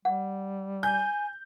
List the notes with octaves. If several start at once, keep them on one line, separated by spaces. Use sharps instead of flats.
G3 F#5
G#5 G6